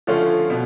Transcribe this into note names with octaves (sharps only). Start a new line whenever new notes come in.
D3 F3 A3 C#4 F4
B2